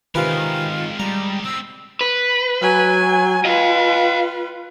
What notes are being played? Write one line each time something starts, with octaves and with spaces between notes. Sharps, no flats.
C3 D#3 E3 G#3 F4 A#4 B4
G3 A#5
B3 C4 E6
B4
F#3 G#5
F4 B4 D#5 F5